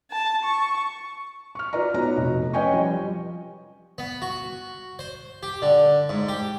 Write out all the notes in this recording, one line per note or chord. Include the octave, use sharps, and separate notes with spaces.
A5
C#6
C#6 F6
F4 F#4 B4 D5 A#5
B3 D#4 F#4 B4 C#5 A#5
F1
C#4 B4 D#5 G5 G#5 C#6
F3 G3
B3
F#4
C5
G4
D3
G#2
G4